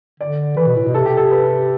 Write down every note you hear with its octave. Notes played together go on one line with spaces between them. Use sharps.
D3 D5
E3 B4
B2
A2
B2
C3 A4
G4
A4
B4